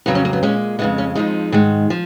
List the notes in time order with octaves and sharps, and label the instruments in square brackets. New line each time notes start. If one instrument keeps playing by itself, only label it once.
[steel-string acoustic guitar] F2 C#3 F#3 B3
C#4
A#3
B3
A#2 G#3 C#4
F2 C#3 G#3 B3
C#4
F2 F3 G#3 D#4
G#2 D#3 G#3
F3